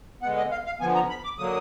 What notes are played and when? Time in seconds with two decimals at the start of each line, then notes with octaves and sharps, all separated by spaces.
0.22 D3 G#3 B3 F#5
0.37 D#5
0.52 F5
0.66 F5
0.80 D3 F3 B3 G#5
0.95 A#5
1.10 B5
1.24 D6
1.38 D3 F#3 A#3 D#6